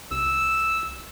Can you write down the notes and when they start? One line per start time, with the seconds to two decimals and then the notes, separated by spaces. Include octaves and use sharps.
0.11 C2 E6